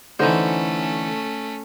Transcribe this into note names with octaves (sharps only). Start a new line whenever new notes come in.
D3 E3 A3 C#4 D#4 C5